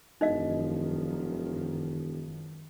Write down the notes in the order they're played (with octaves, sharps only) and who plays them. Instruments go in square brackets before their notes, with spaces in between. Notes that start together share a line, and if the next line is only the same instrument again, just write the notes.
[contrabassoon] E1 [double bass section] F#2 D#3 F3 [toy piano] D#4 D#5 F5